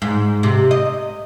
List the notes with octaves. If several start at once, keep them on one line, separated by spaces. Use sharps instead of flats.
G#2
C3
D#5